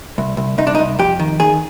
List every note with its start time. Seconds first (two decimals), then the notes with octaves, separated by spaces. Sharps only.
0.18 C2
0.37 C2
0.58 C2 D#4
0.67 D4
0.75 D#4
0.79 C2
0.99 F2 G4
1.20 D#3
1.40 D#3 G#4